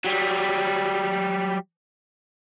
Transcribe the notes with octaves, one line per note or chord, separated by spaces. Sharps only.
F#3 G3